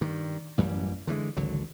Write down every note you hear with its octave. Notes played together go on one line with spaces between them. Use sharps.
G2 D#3
A1 F#2 E3 G3
D3 E3 F3 G#3
G#1 C#2 D3 F#3